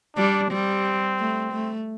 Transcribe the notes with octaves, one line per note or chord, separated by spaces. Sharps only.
G3 D4
G3 C4
A3
A3